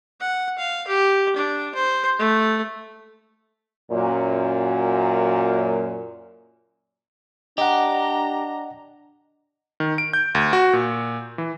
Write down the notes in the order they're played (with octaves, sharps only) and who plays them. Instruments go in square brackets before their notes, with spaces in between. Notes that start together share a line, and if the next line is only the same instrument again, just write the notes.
[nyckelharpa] F#5
F5
G4
D4
C5
A3
[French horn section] F#2 A#2
[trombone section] D4 [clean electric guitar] G4 [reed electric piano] D#5 F#5 [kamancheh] A#5
[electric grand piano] D#3
D7
G6
D2
F#4
A#2
E3